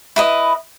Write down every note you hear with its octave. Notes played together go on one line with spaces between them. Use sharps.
E4 B4 D#5